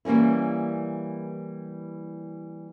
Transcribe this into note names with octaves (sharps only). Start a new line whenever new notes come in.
E3 G3 A#3 C#4 E4